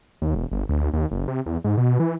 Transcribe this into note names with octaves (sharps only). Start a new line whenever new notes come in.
D#2
E1
G1
D2
D#2
F#1
C3
E2
G#2
B2
E3